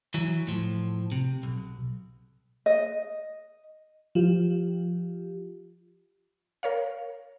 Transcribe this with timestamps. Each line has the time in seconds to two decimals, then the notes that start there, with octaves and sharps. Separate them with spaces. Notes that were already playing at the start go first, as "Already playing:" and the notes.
0.14 E3 F#3
0.47 A2 F3
1.12 C3
1.43 B1
2.66 D#5
4.15 F3 F4 G4
6.63 A#4 C#5 F5